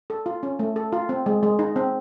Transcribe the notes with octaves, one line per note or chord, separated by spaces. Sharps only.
A4
F4
C#4
A3
A4
F4
C4
G#3
G#3
D#4
C4